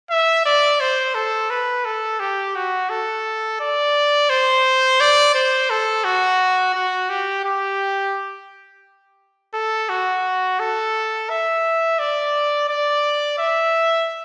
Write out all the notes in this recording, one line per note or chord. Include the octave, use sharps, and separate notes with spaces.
E5
D5
C5
A4
B4
A4
G4
F#4
A4
D5
C5
D5
C5
A4
F#4
F#4
G4
G4
A4
F#4
A4
E5
D5
D5
E5